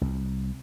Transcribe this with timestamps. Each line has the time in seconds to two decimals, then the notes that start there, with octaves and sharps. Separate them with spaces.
0.01 C2